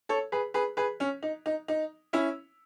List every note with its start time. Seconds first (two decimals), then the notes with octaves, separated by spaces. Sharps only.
0.09 A4 C#5
0.32 G#4 B4
0.54 G#4 B4
0.77 G#4 B4
1.00 C#4
1.23 D#4
1.46 D#4
1.68 D#4
2.13 C#4 E4